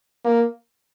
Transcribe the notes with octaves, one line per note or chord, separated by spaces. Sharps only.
A#3